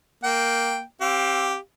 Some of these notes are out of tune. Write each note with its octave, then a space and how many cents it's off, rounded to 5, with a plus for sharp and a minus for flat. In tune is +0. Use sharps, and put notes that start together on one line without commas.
A#3 +0 G5 +0
C4 +25 G4 +0 F5 +20